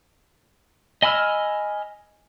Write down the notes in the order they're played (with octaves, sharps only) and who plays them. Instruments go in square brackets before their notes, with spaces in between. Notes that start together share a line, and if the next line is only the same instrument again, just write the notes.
[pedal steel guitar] D#5 G#5 B5 E6 F6